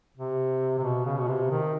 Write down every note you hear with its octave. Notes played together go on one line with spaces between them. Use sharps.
C3
C3
B2
C#3
B2
C3
D#3